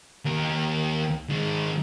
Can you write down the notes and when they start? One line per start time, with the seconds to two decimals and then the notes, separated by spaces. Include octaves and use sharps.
0.25 D#2 A#4
1.29 D#3 G#3